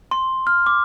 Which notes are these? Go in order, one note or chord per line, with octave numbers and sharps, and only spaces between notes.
C6
F6
D6